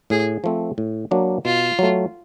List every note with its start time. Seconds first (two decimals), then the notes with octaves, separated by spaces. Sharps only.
0.10 A2 G#4
0.44 F3 A3 C4
0.78 A2
1.11 F#3 A#3 D4
1.45 B2 F4
1.79 F#3 A3